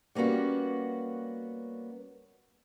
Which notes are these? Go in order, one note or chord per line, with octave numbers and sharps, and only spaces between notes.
G3 A#3 B3 C#4 F#4